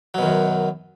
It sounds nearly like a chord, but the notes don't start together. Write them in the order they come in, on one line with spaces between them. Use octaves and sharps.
F#3 B2 D#3 F#2